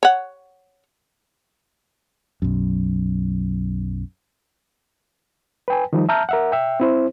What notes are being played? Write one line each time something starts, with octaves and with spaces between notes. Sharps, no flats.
C#5 F#5
B1 F#2
B4 G5 G#5
D#3 F3 G3 D#4
E5 A5 A#5 F6 G6
A#4 E5 F#5
E5 G5
C4 E4 C5